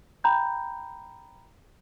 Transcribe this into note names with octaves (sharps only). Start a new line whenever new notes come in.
G5 A#5 B5 G6